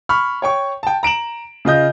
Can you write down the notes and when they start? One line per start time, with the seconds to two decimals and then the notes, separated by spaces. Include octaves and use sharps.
0.09 B5 C#6 F6
0.42 C#5 G5 C#6
0.83 G5 A5
1.03 A#5 D7 E7 F#7
1.65 C#3 F4 D#5 G6